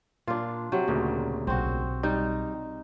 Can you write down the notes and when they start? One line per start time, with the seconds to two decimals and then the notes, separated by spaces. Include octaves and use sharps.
0.28 A#2 D4 F4
0.72 C3 F#3
0.88 D2 A#2 C#3
1.47 B1 C4 F#4
2.03 G3 D#4